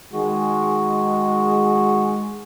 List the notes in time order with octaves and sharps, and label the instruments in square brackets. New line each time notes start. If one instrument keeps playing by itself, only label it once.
[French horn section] D#3 G#3 [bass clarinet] F#4